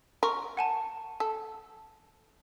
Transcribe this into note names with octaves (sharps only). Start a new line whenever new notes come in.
A#4 C6 C#6
F#5 G#5 A5
A4 G#5